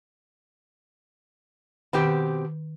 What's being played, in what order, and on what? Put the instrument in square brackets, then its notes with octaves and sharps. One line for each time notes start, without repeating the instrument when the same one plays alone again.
[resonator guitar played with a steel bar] B2 C4 G4 [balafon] D#3